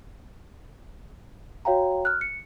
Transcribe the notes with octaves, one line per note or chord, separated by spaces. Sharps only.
F#4 C#5 F5 G5 A#5
F6 F#6
C#7